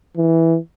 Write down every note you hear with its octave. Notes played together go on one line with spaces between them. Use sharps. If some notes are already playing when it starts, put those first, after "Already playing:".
E3